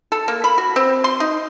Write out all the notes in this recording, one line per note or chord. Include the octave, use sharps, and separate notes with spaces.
A4
A#3
B5
F#4
C4
C6
D#4